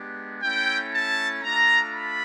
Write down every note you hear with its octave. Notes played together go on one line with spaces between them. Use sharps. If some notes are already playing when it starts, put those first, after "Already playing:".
Already playing: G#3 B3 D4 G4
A3 C#4 E4 G5
A5
A3 D4 F4 A#5
B5